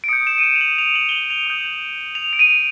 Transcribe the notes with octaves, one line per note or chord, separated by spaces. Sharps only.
D7
D#6 G6 C#7
E7
D#7
E7
F7
F#7
F7
F#7
G7
F#7
F7
D#6 G6
F7
D7
D#7